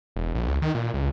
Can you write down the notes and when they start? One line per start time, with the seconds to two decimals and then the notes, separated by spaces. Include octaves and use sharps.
0.16 E1
0.35 A#1
0.48 C#2
0.62 D#3
0.75 A#2
0.94 C#2